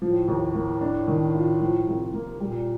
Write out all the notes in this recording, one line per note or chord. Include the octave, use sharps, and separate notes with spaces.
A2 F3
D#2
A#3
D4
D#3
F4
F3
C2
A#3
A#2 G3